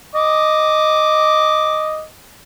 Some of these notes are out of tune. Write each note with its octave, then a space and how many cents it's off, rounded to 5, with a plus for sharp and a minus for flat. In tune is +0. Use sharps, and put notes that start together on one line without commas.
D#5 -5 D6 +0